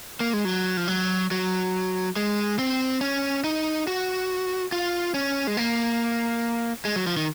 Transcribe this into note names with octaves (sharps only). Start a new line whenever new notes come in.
A#3
G#3
F#3
F3
F#3
F#3
G#3
C4
C#4
D#4
F#4
F4
C#4
G#3
A#3
G#3
F#3
F3
D#3